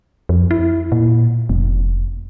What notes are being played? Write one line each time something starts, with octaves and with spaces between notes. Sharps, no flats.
F2
E4
A#2
F1